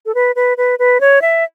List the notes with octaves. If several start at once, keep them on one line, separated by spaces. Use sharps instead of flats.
A4
B4
B4
B4
B4
C#5
E5